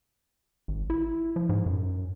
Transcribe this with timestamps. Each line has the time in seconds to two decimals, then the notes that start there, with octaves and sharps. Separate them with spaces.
0.68 G#1
0.90 E4
1.36 F3
1.49 G#2
1.66 F#2